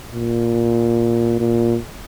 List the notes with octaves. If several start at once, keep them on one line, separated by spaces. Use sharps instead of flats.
A#2
A#2